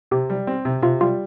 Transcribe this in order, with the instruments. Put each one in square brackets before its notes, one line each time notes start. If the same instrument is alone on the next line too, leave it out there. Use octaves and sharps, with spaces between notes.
[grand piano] C3 [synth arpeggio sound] G4
[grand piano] G3
C4
C3
[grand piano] C3 [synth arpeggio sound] F4
[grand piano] G3 [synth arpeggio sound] F4